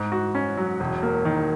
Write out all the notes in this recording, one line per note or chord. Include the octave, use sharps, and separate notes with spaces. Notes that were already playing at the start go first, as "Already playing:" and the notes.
Already playing: G#2
F#4
C#4
F#3
E1
A#3
D#3